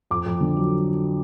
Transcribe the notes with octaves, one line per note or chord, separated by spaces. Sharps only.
F2 D6
F2
D3
F#3